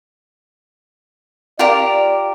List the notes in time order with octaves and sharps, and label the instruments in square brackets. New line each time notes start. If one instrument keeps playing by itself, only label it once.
[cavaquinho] F4 G4 A#4 [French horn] D5